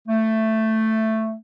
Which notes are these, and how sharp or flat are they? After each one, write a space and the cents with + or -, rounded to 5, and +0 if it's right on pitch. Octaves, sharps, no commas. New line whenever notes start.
A3 +5